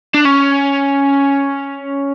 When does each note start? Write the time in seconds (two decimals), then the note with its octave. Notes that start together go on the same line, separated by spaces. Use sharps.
0.14 D4
0.25 C#4